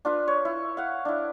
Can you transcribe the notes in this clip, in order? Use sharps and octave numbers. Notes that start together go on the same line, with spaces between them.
D4 F4 B4
C#5
E4
F5 F#5
D4 E4